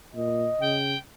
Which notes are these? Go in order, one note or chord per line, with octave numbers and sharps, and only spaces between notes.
A#2 D#5
C#3 G5